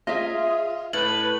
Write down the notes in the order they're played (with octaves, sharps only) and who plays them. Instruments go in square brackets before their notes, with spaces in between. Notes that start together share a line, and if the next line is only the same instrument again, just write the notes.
[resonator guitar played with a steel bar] F4 [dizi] G#4 [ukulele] D#5 E5
[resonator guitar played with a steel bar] A2 [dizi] B4 [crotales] F#7